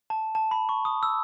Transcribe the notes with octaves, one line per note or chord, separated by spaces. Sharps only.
A5
A5
B5
C#6
D#6
E6